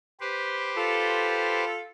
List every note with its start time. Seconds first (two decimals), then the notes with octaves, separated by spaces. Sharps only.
0.21 G4 B4 C5
0.76 F4 A4